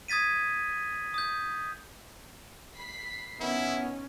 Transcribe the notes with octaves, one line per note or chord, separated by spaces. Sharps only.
D#6 G#6 A6 B6 D#7
D#6 G6
B5 B6 C7
B2 D#3 B3 C#4 E4